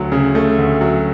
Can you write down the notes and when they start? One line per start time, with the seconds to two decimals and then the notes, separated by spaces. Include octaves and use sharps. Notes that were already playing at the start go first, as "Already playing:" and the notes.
Already playing: D2 F#3 A3
0.12 C#3
0.35 A3
0.59 D2
0.81 F#3